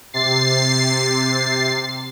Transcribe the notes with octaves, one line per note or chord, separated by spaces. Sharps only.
C3 A6 C7